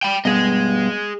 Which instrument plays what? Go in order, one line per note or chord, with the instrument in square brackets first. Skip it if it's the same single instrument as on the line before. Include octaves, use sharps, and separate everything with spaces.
[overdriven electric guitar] G5 B5
[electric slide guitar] G2 B2 [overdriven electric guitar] G#4 D#5